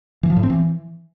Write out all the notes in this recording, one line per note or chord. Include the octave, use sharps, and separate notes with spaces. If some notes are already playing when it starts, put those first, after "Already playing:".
E3
F3
A2
C4
E3